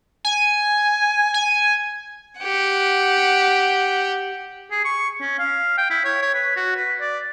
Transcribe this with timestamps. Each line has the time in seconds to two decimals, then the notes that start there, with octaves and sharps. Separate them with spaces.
0.25 G#5
1.34 G#5
2.40 G4 F#5
4.71 G#4
4.85 C#6
5.21 C#4
5.39 F5
5.78 G5
5.90 E4
6.04 C#5
6.22 C#5
6.34 B4
6.56 F#4
6.76 B4
7.01 D5